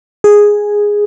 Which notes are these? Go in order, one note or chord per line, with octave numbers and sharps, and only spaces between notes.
G#4